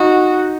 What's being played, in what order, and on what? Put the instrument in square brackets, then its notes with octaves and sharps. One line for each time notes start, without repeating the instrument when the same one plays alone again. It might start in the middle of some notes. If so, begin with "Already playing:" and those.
Already playing: [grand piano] D#4 [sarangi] F#4